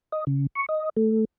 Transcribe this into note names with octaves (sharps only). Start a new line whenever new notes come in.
D#5
C#3
C#6
D#5
A3